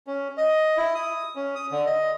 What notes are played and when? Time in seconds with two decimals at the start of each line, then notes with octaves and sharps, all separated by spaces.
0.07 C#4
0.38 D#5
0.77 E4
0.95 D#6
1.36 C#4
1.55 D#6
1.72 D3
1.86 D#5